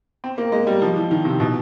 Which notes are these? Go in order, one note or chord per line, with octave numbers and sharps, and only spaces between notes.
C4
A#3
G#3
G3
F3
E3
D#3
C3
B2